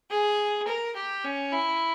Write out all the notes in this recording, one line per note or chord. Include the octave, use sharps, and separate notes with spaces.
G#4
A#4
G4
C#4
E4